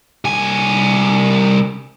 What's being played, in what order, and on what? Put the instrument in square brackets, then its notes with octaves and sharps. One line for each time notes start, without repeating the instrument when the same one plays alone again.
[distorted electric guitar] C2 G#5